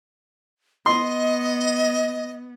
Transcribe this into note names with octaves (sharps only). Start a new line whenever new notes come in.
B3 D#5 C6